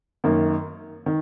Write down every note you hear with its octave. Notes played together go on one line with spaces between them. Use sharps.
F#2 D#3 A#3
D#3